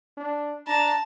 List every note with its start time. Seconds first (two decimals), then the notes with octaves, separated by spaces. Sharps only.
0.17 D4
0.67 D4 A5 A#5